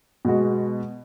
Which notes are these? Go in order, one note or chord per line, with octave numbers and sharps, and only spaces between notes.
B2 G#3 B3 F#4